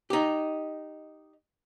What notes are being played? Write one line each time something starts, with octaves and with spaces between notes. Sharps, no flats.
D#4 G4